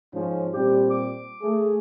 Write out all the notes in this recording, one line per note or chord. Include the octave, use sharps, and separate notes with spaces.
G#2 F3 C#4
A#2 G3 C4 G4
D6
A3 G#4